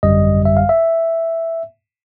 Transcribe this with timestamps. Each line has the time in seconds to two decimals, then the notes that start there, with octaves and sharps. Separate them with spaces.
0.03 G#1 F#2 D3 G3 D#5
0.45 E5
0.57 F5
0.69 E5